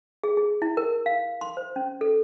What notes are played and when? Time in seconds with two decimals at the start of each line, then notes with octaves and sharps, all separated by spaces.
0.24 G#4
0.37 G#4
0.62 E4
0.77 A#4
1.06 F5
1.41 C6
1.57 C5
1.76 C#4
2.01 A4